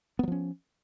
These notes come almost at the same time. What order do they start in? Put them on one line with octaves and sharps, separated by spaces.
B3 F#3 F3 C#4